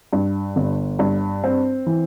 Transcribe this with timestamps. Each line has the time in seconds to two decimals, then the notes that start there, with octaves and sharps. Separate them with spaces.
0.13 G2
0.56 G1
0.99 G2
1.44 C4
1.87 E3